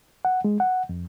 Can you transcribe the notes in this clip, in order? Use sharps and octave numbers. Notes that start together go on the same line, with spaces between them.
F#5
G#3
F#5
F2